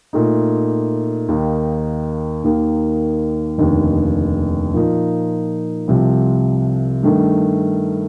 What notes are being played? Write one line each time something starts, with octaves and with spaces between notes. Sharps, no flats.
A#2 A3 D#4
D#2 D#3 A#3 D#4
D#2 D#3 A#3 D#4
F1 D#2 D3
A#2 F3 A#3 D#4
C2 C3 F3
G2 D#3 A3